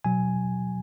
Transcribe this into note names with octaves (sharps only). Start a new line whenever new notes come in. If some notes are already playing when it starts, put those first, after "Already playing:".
B2 F#3 G#5